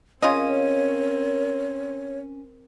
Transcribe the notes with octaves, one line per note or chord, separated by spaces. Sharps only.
C#3 C4 C#4 F4 A#4 C#5 D#5